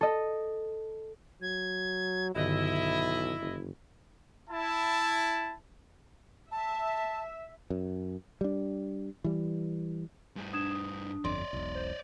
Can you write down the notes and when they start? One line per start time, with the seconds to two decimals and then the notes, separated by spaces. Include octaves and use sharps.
0.01 A4 D#5
1.42 F#3 G#6
2.35 B1 G2 D3 D#3 E4 D#5
3.41 F#1
4.50 E4 A5
6.51 E5 A5
7.70 F#2
8.41 G3 D4
9.24 E3 G3
10.36 G2 G#4
10.53 D4 D#6 G#6 E7
10.71 D#6
11.25 G1 F2 C#5 D5 C6
11.53 E1 B1
11.75 C5